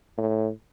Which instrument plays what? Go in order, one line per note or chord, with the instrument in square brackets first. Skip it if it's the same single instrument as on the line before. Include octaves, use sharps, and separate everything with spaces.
[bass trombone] A2